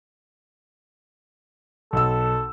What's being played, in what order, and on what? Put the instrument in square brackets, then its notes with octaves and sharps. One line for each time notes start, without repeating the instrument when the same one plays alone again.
[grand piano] B1 E6 [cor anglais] A4